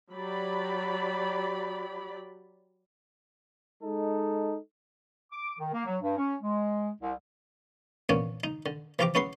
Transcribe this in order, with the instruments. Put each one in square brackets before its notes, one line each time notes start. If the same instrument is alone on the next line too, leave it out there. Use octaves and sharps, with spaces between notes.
[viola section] F#3 G4 D5 B5
[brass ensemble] G#3 D#4 A4
[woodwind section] D6
D#3
A#3
F#3
G2
C#4
G#3
C2
[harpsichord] E2 A#2 C#4 D4 C#5 F#5
D#4
D3
E3 F3 F4 G4 A#5 D6
C#4 E4 G#4 B4 F#5 C6